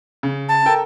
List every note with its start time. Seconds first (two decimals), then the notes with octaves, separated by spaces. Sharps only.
0.23 C#3
0.49 A5
0.66 A4 A#4 G5